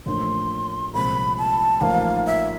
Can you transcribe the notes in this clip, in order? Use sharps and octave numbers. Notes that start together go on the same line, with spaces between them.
A1 A2 F3 A#3 D4 C6
C2 A#2 F3 G#3 C4 B5
A5
A1 G#2 F3 A#3 D#4 F5
E5